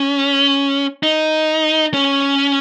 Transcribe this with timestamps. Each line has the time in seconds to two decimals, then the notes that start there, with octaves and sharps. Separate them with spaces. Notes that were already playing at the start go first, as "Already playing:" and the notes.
Already playing: C#4
1.03 D#4
1.94 C#4